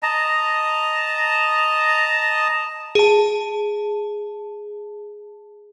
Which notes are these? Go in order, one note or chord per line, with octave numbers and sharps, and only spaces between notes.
D#5 A5 A#5
G#4 A5